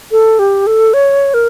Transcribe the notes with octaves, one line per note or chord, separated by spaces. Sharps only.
A4
G4
A4
C#5
A#4